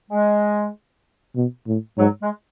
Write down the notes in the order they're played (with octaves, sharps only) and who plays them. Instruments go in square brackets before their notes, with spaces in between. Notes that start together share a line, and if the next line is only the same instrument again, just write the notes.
[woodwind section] G#3
[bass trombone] B2
A2
[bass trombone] G#2 [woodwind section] F#3
[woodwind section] G#3